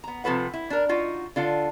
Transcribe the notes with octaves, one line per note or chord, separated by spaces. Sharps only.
B3 A#5
C3 F3 A4 B4 F#5
E4
D4 A#4
D#4 F4 F#4
D3 F4 A4